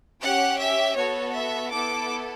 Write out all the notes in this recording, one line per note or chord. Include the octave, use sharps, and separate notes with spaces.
C#4 G4 F#5
E5
B3 F#4 A4 C#5
E5
B3 E4 A4 D6